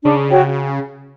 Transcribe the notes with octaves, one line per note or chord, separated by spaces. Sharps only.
C#3 D4
F#4 C#5 G5